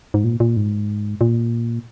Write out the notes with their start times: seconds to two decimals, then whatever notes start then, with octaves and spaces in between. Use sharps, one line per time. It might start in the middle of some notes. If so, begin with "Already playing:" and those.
0.14 G#2
0.24 A#2
0.40 A#2
0.57 G#2
1.21 A#2